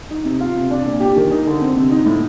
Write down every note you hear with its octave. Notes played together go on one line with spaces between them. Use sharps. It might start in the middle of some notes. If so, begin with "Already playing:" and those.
D#4
C3
F4
C3
D4
A#2
G4
D#3
D#4
D3
C4
C3
D#4
A2